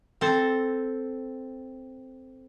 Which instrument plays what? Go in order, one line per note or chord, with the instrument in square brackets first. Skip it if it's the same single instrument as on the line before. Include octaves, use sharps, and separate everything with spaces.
[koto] C4 A4